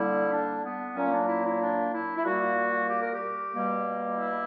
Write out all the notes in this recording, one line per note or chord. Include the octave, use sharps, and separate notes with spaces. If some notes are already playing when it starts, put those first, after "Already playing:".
Already playing: D3 G3 A#3 E4
D4
B3
A#2 F#3 A#3 C#4
D4
E4
E4
D4
E4
E4
A#2 G3 A#3 F#4
G4
A#4
G4
B2 G3 A#3
E4